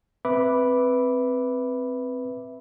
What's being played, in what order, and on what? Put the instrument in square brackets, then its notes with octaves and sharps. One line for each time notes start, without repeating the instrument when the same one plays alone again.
[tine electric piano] C4 B4 E5 B5 D6